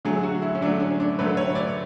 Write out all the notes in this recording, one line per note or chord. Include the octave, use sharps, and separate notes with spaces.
D3 F#3 A3 G#4
F#4
E4
C#4
D3 F#3 A3 D4
C#4
D4
D3 F#3 A3 B4
C#5
D5